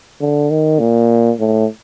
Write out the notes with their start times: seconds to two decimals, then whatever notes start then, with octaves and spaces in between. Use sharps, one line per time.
0.21 D3
0.51 D#3
0.80 A#2
1.39 A2